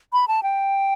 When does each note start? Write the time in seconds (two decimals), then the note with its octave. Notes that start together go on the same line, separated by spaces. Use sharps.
0.13 B5
0.28 A5
0.43 G5